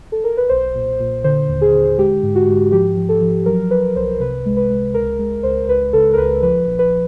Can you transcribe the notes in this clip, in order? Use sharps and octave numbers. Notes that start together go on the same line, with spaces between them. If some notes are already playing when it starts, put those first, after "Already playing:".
A4
A#4
B4
B1 C5
A#2
A#2
D3 C5
D#2
G#4
D3
G#3 G4
G#2
F#4
G#2
F3 G4
F3
A4
F3
F#3 A#4
F#3 B4
C2 C5
C3 B4
G#3
B4
G#3
C#2 A#4
G#3
C#2 C5
C#2 B4
C#3 A4
A#4
C#2 B4
F3 B4
A#1
B4